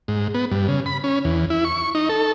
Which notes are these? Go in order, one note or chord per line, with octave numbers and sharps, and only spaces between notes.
G#2
B3
G2
C#3
B5
C#4
E2
E4
C#6
D#4
A4